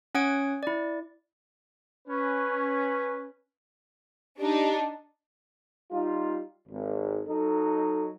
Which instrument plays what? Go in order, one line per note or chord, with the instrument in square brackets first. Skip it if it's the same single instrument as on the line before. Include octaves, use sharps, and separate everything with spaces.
[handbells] C#4 C#5 F#5 D#6 G#6 D7
E4 D5
[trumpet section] C#4 B4
[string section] D4 D#4 [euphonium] G4
[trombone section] G3 D#4 F4
G#1
F#3 D#4 A4